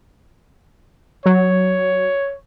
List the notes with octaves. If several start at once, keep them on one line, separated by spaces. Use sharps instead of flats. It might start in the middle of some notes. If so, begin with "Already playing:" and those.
F#3 C#5